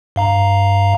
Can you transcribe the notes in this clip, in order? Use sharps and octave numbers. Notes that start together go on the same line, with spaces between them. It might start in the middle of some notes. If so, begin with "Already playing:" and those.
G2 F5 A#5